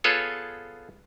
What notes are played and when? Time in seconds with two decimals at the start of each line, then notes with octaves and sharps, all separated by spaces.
0.04 B3 F4 G#4 A4 C#5